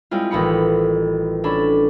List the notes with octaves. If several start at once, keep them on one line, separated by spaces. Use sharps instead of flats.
G3 G#3 C4 E4 F4
A1 D#3 D#4 B5 C#7
C#4 D4 A4 B5